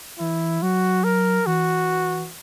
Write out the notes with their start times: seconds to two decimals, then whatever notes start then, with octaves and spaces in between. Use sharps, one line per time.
0.19 E3 E4
0.62 F#3 F#4
1.04 A#4
1.46 E3 F#4